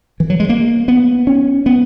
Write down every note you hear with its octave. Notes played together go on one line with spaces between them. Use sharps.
E3
F#3
G#3
A#3
B3
C#4
B3